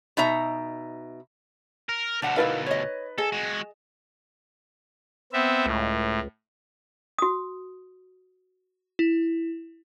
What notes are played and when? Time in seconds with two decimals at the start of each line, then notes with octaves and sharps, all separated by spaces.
0.17 B2 D#4 E5 A#5
1.89 A#4
2.22 D2 B2 D4 F#5
2.36 D#4 E4 A#4 B4 F5 A6
2.66 C#5 D#5
3.18 G#4 A4 D#5 G#5
3.32 G#3 F#4
5.33 B3 C4 E5
5.66 C#2 A2
7.19 F#4 D#6
8.99 E4